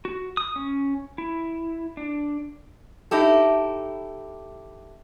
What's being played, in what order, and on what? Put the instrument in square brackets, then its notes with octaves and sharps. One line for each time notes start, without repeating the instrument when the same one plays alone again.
[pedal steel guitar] F#4
D#6
C#4
E4
D4
[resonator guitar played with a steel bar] D#4 E4 G4 A4